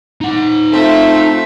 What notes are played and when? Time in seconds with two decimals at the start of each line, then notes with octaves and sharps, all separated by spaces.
0.21 D#4 F#5
0.72 A3 C4 F4 E5